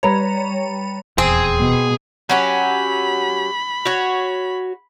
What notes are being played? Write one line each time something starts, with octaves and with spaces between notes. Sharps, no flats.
G3 B4 C#5 A#5
D#1 E2 C4 G#4 G#5
B2
F#3 C#4 G4 B5
F#4 C#5